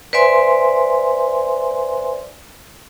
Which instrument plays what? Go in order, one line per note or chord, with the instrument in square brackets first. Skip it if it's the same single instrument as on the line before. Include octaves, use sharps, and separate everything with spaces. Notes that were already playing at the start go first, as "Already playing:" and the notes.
[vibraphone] B4 C5 D5 E5 G#5 C6